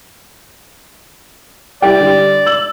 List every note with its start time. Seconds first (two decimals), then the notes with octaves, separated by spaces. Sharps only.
1.82 G3 E4 D5 G5
2.00 D3 G3
2.46 E6 F#7